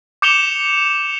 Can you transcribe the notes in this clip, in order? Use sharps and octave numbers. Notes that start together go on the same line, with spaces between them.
D6 G6 C#7 E7 F7 G7